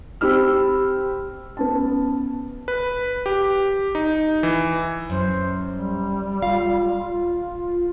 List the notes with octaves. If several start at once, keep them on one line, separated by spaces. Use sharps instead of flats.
C4 G4 B5 E6 F6
B3 C#4 A5
B4
G4
D#4
E3
F#2 C5
G3
F4 F5